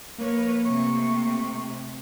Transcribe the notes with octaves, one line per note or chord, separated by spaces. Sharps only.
F3 A#3 A#4 B4 C#5
C3 A3 C#6